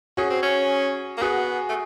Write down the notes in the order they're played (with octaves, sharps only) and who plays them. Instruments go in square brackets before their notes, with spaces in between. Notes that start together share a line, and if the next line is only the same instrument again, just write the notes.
[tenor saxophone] C#4 [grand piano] F#4 G#4
[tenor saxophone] C4
C#4
A#3
[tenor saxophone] B3 [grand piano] F#4 G#4
[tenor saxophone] A3